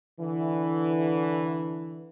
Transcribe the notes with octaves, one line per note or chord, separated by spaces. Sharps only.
D3 E3